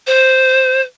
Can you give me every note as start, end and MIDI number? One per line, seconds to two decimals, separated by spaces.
0.07 0.82 72